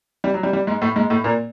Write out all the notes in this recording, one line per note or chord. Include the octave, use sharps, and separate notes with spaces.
G3
F#3
G3
G3
G#2 G#3
A2 A3
G#2 G#3
A2 A3
A#2 A#3